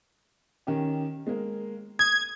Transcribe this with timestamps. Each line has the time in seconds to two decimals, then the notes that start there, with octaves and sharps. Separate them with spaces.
0.67 D#3 C#4 G4
1.27 G#3 A#3
1.99 D#6 G#6